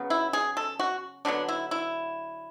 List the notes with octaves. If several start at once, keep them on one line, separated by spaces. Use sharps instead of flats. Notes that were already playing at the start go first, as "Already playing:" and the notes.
Already playing: C#3 F#3 B3
E4
G#4
A4
F#4
D3 F#3 B3 D4
E4
E4